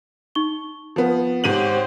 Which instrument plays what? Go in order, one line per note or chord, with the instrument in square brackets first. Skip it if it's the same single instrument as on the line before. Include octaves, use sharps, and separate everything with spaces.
[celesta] D#4 C#6 G7
[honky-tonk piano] F3 B3
[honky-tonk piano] G#2 D#7 F#7 [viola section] G4 C5 C#5